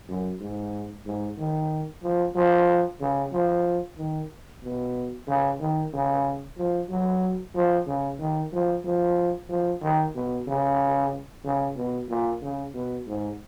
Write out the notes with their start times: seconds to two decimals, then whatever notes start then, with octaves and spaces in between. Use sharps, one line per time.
0.09 F#2
0.41 G#2
1.06 G#2
1.38 D#3
2.03 F3
2.35 F3
3.01 C#3
3.32 F3
3.97 D#3
4.63 B2
5.27 C#3
5.60 D#3
5.93 C#3
6.57 F3
6.89 F#3
7.55 F3
7.87 C#3
8.19 D#3
8.53 F3
8.84 F3
9.49 F3
9.82 D#3
10.15 B2
10.47 C#3
11.45 C#3
11.76 B2
12.09 A#2
12.42 C#3
12.74 B2
13.07 G#2